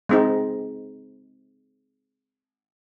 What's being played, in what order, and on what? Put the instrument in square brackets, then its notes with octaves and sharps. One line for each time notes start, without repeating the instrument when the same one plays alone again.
[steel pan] G#3 C4 D#4